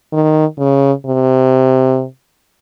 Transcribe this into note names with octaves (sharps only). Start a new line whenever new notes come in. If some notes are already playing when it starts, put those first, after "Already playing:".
D#3
C#3
C3